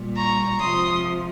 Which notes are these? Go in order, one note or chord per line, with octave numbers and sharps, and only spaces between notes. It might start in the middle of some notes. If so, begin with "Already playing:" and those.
Already playing: A#2 G3
A#5 C#6
C3 F3 G#3 C6 D#6